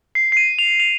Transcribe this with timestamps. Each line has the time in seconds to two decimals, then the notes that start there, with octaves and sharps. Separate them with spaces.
0.15 C7
0.32 C7
0.37 D#7
0.59 F7
0.80 F7